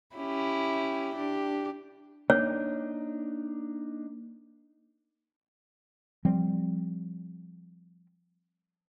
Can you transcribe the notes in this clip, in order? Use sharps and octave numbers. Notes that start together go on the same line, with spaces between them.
C#4 E4 G4
D4 G4
A#3 D4 D#4 C#5
F3 G3 C4